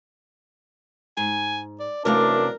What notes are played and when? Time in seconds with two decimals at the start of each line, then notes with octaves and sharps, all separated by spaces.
1.17 G#2 G#5
1.80 D5
2.05 F#2 C3 E3 A3 D4 A#4 F5